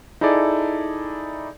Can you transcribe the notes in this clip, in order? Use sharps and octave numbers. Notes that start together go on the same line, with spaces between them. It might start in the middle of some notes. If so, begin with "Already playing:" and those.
D#4 E4 G#4 A4 D5